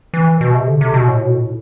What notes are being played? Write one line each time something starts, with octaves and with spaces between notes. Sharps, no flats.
E3
B2
C3
D3
C3
B2
A2
B2
A2